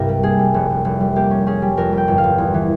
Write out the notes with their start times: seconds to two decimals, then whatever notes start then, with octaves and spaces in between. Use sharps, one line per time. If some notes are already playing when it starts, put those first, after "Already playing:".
Already playing: C2 G2 C3 A#4
0.09 G3
0.23 A#3 G#4
0.39 G3
0.54 F1
0.70 F1
0.85 F1
1.00 G3
1.16 A#3 G4
1.31 C#4
1.47 C#4 G#4
1.62 G3
1.77 F2 A#4
1.93 G3 G5
2.08 G1
2.18 F5
2.24 G1
2.38 E2
2.54 E3